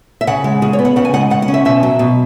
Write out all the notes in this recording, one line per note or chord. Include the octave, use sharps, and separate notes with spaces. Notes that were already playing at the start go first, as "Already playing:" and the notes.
E5
C#3 F#5
G#3
C#3 G#4
C#5
B3
F#5
C#3 F#5
G#5
G#3 F#5
C#3 F#5
F#5
C#4
E5
B2 E5
F#3
B2